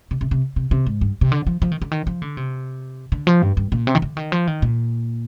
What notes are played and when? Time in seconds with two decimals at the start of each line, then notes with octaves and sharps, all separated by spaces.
0.11 C3
0.21 C3
0.31 C3
0.56 C3
0.71 C3
0.87 G#2
1.01 G2
1.21 C3
1.32 D3
1.47 F3
1.62 F3
1.71 D#3
1.82 D3
1.91 D#3
2.07 F3
2.22 D3
2.37 C3
3.12 D3
3.27 F3
3.42 G2
3.57 G2
3.72 A#2
3.87 C3
3.95 D#3
4.02 D3
4.17 D#3
4.32 F3
4.47 D#3
4.62 A#2